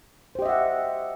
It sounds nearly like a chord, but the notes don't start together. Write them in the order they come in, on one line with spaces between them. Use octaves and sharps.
C5 G4 D#5 E5 F#5